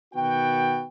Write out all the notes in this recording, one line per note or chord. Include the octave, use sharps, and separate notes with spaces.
B2 D#3 B3 F#4 G5